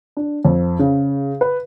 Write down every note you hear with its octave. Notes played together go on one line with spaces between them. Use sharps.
D4
F2
C#3
B4